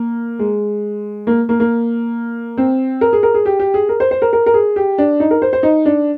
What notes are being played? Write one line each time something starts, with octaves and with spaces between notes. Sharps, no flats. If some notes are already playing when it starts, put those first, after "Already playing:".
Already playing: A#3
G#3
A#3
A#3
A#3
C4
A#4
G#4
A#4
G#4
G4
G4
G#4
A#4
C5
C5
A#4
A#4
A#4
G#4
G4
D4
D#4
A#4
C5
C5
D#4
D4